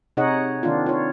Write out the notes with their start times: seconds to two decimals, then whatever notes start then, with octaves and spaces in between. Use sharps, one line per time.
0.17 C3 D#4 G#4 C#5 D#5 F#5
0.63 D#3 A#3 C4 D4 F4
0.86 F4 C#5